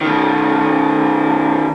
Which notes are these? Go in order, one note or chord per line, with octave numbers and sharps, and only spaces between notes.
B2 D#3